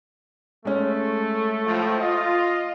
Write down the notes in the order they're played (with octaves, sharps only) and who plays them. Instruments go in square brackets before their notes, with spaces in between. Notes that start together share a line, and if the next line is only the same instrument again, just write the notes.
[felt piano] G#3 C#4 [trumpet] A3
[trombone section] A2 F3
[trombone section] F4 [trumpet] D#5